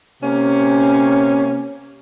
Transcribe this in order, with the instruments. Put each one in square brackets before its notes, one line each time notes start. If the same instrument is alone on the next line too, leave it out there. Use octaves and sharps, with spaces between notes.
[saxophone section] C3 A#3 C#4